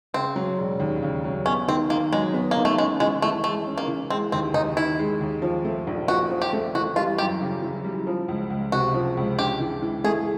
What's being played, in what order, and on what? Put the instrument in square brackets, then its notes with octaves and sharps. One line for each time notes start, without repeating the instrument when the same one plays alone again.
[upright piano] C#3 [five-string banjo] C4
[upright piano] F#3
E1
D#2
C#3
F#3
[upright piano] B3 [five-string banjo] C#4
[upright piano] D#3 [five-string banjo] C4
[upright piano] D#3 [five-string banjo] A#3
[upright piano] F#3 [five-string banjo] G#3
[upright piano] B3
[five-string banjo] A#3
[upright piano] D#3
[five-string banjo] A3
[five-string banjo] G#3 [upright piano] C#4
[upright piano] E3 [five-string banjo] G#3
[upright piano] E3 [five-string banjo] A3
[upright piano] G#3 [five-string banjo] A3
[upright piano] C#4
[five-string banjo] A#3
[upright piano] E3
[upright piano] G#3 [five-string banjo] C4
[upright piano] D#2 [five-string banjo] C4
[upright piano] D#2 [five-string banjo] D#4
[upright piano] D#3 [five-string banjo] E4
[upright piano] G#3
D#2
F3
A3
A#1
[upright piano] A#2 [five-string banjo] F#4
[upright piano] F3
[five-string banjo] G4
[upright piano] A3
[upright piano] E3 [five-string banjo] F#4
[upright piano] G3 [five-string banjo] F4
[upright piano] F#2 [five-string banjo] G4
[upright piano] C#3
E3
G3
F3
C#2
C#2
[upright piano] C3 [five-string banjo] F#4
[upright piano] F3
C#2
[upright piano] D4 [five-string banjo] G4
[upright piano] E3
E3
[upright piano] A3 [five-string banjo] G#4